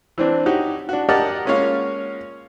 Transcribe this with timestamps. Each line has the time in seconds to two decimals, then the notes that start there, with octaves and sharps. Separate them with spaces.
0.18 E3 C4 D4
0.46 D#4 F#4 G4 C#5
0.89 D4 F#4
1.09 G4 A#4 D5 D#5 F#5 A5
1.45 G#3 A#3 C#4 F4 C#5 F5